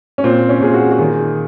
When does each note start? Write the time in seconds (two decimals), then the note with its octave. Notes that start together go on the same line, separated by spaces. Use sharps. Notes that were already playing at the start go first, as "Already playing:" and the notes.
0.18 C#4
0.24 A#2 C4
0.49 C#4
0.61 A#2 G#4
0.74 F#4
0.91 F#4
0.99 D#3 G#4